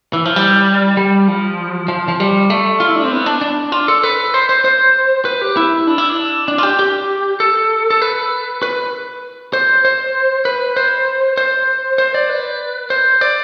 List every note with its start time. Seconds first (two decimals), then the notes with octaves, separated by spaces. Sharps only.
0.13 E3
0.25 F3
0.36 G3
0.97 G3
1.28 F3
1.88 F3
2.08 F3
2.20 G3
2.50 A3
2.80 F4
2.87 E4
2.96 D4
3.04 C4
3.12 B3
3.26 D4
3.41 D4
3.72 F4
3.88 A4
4.03 B4
4.34 C5
4.49 C5
4.65 C5
5.25 B4
5.41 G4
5.57 E4
5.87 D4
5.98 E4
6.10 D4
6.48 D4
6.58 F4
6.63 G4
6.79 G4
7.40 A4
7.90 A4
8.02 B4
8.63 B4
9.53 C5
9.85 C5
10.45 B4
10.77 C5
11.38 C5
11.98 C5
12.14 D5
12.29 B4
12.90 C5
13.21 D5